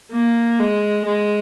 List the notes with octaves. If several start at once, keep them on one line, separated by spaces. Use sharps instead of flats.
A#3
G#3
G#3